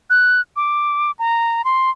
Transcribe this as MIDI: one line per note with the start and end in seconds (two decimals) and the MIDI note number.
0.10 0.41 90
0.56 1.11 86
1.19 1.62 82
1.65 1.90 84